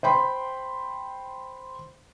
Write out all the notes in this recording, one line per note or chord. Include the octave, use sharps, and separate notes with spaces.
C5 G5 B5 C6